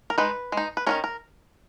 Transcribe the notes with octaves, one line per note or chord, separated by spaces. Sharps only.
A#4
G#3 D#4 B4
G#3
D#4
B4
D#3 F#3 C#4 A#4
A#4